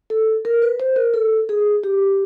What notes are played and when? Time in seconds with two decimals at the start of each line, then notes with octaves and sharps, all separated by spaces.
0.10 A4
0.45 A#4
0.62 B4
0.80 C5
0.96 A#4
1.14 A4
1.49 G#4
1.84 G4